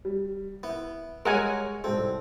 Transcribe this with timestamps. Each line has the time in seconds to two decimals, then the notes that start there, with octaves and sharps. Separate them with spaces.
0.05 G3
0.63 B3 E4
1.25 G3 G#3 A#4 C#5 F#5 G#5 F7
1.84 C2 G#2 C4 A4